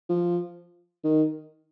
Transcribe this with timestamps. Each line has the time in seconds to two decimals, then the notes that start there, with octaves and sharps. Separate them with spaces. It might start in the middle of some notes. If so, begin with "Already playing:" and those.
0.09 F3
1.04 D#3